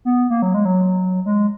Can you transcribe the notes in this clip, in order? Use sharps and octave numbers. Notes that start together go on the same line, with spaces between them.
B3
A#3
F#3
G#3
F#3
G#3